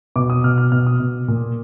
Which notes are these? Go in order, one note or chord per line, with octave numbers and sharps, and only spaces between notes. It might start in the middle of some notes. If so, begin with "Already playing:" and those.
B2 D6
D#6
B2 F6
F6
B2 F6
D#6
B2
A#2